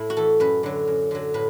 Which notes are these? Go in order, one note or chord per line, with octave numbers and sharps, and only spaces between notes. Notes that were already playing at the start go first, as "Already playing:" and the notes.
Already playing: A2 E4
F#4
E3 A4
F#2 B4
D3 F#3
F#2
D3 F#3
A2 B4